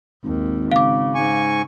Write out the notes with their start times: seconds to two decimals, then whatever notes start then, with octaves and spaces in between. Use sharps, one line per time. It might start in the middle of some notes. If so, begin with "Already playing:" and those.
0.24 G#1 D#2
0.72 C#3 F5 D6
1.15 G#2 G#5 C#6